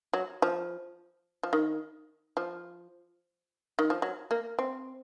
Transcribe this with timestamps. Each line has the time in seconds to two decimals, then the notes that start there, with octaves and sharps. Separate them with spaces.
0.13 F#3
0.42 F3
1.43 F3
1.53 D#3
2.37 F3
3.79 D#3
3.90 F3
4.02 F#3
4.31 A#3
4.59 C4